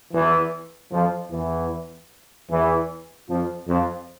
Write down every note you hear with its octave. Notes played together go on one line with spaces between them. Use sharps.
E2 E3
F2 F3
E2 E3
E2 E3
F2 F3
F2 F3